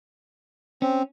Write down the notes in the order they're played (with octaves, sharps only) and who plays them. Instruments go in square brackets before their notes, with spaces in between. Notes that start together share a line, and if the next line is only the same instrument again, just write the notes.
[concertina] C4 [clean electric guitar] C#4